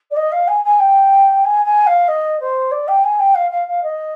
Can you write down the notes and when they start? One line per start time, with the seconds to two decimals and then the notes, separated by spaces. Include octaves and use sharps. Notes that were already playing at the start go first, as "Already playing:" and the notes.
0.11 D5
0.16 D#5
0.31 F5
0.47 G#5
0.64 G#5
0.79 G5
1.44 G#5
1.64 G#5
1.86 F5
2.08 D#5
2.39 C5
2.71 D5
2.87 G5
3.03 G#5
3.19 G5
3.34 F5
3.51 F5
3.67 F5
3.83 D#5